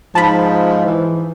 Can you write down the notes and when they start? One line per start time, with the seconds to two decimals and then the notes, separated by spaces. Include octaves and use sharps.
0.15 G#2 F3 A5 B5
0.86 E3